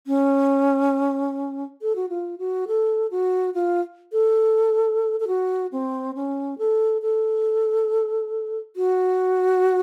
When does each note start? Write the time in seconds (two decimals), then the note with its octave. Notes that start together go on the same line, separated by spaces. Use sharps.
0.07 C#4
1.82 A4
1.96 F#4
2.09 F4
2.39 F#4
2.68 A4
3.11 F#4
3.54 F4
4.12 A4
5.20 A4
5.28 F#4
5.72 C4
6.15 C#4
6.58 A4
7.02 A4
8.76 F#4